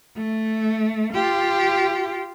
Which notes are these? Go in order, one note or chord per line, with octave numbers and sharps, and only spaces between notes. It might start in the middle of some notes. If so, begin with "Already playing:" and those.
A3
F4 G4